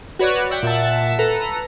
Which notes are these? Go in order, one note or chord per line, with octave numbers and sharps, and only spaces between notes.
F#4 B4 C#5 D5 F#5
D5 E5 F#5 G5
A#2 E5 F#5 A5
A4 B4 A#5